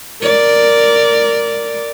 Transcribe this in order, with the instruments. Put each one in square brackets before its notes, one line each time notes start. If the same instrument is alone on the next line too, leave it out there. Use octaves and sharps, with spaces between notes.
[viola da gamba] A#4 D5